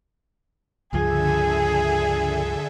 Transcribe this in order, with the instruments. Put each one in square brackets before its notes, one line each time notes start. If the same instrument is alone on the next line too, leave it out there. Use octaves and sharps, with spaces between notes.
[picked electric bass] C#2 G2 F3 [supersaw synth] D3 A4 E5 [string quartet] G#4